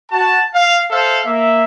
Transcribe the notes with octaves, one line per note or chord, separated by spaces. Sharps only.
F#4 A5
F5
A4 C5 E5 F5
A#3 E5